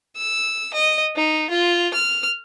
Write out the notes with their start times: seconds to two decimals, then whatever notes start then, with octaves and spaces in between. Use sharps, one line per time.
0.17 E6
0.74 D#5
1.16 D#4
1.50 F4
1.94 F6